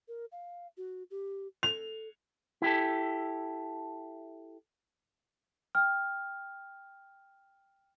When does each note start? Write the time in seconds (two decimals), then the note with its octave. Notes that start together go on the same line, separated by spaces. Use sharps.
0.08 A#4
0.32 F5
0.77 F#4
1.11 G4
1.63 A4 F7
2.62 E4 G4 A4
5.75 G5 F6